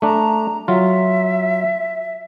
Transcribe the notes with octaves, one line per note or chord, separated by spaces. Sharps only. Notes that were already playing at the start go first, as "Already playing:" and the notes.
A3 D4 A#5
F#3 F4 E5